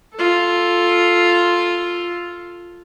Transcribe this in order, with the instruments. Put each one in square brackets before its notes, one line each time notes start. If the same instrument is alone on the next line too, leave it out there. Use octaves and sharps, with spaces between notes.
[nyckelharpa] F4 A4